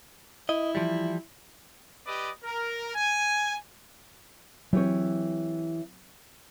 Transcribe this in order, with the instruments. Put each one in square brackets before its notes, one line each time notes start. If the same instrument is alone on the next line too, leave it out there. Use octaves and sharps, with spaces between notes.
[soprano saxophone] E4 [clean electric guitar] D#5
[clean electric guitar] E3 F3 G3
[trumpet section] G4 B4 D5 D#5
A#4
G#5
[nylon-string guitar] E3 G4 C#5 [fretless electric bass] F#3 C4